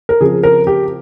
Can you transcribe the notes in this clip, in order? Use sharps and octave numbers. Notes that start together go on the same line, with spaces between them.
A#4
C#3 F3 C4 G#4
A#4
G4